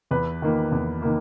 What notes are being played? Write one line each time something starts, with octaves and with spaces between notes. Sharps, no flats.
E2 B4
D#3 A#3
E2
D#3 A#3